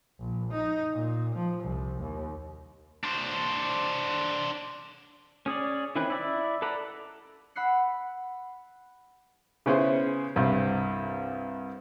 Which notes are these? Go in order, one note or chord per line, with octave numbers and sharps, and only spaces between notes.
A#1
D#4
A#2
F3
C2
D#2
D4 C5
C#4 G#4 C#5 D5
D#3 E3 C4 C#4 B4
E4 D5 E5
A4 B4 D5 F#5 A#5
F#5 B5 E6 F#6 C7 C#7
C#3 B3 C#4 E4 G#4 C5
C2 G2